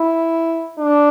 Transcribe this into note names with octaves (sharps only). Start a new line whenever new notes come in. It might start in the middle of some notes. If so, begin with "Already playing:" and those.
Already playing: E4
D4